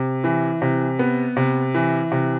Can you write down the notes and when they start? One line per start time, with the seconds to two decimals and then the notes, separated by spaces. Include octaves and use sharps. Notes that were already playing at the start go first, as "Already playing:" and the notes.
Already playing: C3
0.24 E3
0.62 C3
0.99 B3
1.37 C3
1.75 E3
2.12 C3